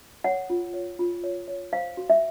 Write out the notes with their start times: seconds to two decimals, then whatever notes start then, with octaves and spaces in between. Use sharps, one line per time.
0.24 C#5 F#5
0.50 F4
0.74 C#5
0.99 F4
1.24 C#5
1.48 C#5
1.72 C5 F5
1.97 F#4
2.10 E5